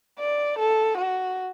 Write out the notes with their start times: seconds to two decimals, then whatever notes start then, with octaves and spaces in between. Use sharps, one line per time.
0.19 D5
0.59 A4
0.98 F#4